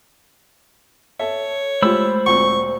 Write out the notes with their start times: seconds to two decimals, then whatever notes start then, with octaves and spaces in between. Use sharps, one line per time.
1.19 A4 C#5 E5
1.82 G#3 A3 F4 G4 C5 B5 E6
2.26 D2 A#2 C4 C#6